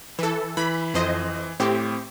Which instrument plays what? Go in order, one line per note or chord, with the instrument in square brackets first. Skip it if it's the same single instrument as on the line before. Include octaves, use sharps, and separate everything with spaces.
[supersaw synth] E3 A4
[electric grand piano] E3 [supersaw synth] B5
[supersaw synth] F2 C5 D#5
[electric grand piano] A2 [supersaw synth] C4 G4